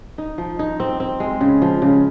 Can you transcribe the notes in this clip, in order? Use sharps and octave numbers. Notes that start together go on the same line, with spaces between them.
D#4
F3
D#4
C4
C4
G#3
C#3
F3
C#3